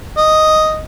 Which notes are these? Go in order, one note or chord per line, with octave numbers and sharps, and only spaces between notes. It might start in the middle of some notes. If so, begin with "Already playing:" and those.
D#5